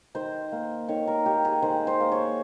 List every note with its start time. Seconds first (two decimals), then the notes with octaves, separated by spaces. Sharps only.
0.15 D#3 C5
0.52 A#3
0.88 D#3 C#5
1.07 A#4
1.26 A#3 G4
1.45 G#4
1.62 D#3 C5
1.87 C5
2.00 A#3
2.12 C#5